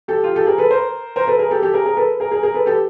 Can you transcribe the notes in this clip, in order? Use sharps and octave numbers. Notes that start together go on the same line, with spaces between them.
G4 A4
F4 G4
G4 A4
G#4 A#4
A4 B4
A#4 C5
A#4 C5
A4 B4
G#4 A#4
G4 A4
G4 A4
G#4 A#4
G#4 A#4
A4 B4
G#4 A#4
G#4 A#4
G#4 A#4
A4 B4
G4 A4